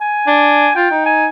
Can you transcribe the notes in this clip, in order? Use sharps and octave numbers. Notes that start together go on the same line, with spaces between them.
G#5
D4
F4 G5
D#4
G#5